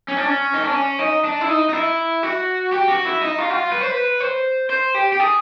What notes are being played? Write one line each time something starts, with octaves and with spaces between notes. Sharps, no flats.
C#4
D4
C#4
D#4
D4
C#4
D#4
D4
E4
D#4
D#4
E4
F#4
G4
F#4
E4
D#4
F4
F#4
F4
B4
C5
B4
C5
C5
G4
G4
G#4